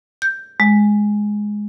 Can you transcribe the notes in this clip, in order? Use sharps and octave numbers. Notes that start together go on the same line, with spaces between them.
G6
G#3